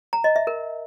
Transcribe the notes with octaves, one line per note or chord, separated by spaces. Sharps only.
A#5
D#5
E5
A#4